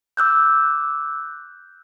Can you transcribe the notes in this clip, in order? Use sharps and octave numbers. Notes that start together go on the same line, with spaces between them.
D6 E6 F#6 G6